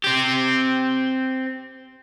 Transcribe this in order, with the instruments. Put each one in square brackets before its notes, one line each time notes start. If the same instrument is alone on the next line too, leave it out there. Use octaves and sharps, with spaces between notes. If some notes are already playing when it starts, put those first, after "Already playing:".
[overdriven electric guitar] C4 G4